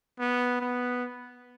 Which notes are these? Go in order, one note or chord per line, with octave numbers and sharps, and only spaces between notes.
B3
B3